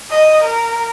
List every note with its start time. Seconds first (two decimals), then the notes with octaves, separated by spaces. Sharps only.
0.10 D#5
0.44 A#4